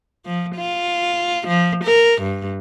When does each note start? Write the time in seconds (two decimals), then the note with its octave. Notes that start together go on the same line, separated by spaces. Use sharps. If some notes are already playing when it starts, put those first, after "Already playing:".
0.26 F3
0.56 F4
1.48 F3
1.84 A#4
2.22 G2